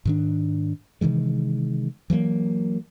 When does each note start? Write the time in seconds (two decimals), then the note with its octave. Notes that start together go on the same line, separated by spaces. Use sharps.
0.05 G#2 D#3 D4
1.01 C3 D#3 E3 G#3
2.10 E3 F#3 A3 A#3